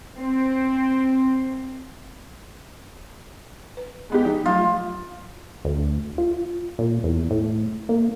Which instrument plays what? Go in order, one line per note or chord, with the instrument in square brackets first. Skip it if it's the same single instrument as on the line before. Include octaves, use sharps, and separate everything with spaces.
[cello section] C4
[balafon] B4
[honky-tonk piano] G#3 B3 G4
[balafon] F3 [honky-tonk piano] D#4
[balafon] F#3 A3 [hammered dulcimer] F4
[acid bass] D2
F4
A#2
E2
A2
A#3